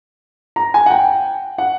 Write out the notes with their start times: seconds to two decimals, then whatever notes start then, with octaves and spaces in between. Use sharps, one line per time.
0.56 A#5
0.74 G#5
0.86 F#5
0.91 G5
1.58 F#5